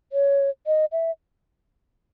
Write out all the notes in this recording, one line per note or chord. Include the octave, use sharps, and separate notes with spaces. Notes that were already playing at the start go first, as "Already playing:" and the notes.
C#5
D#5
E5